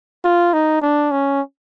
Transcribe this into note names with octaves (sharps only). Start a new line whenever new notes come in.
F4
D#4
D4
C#4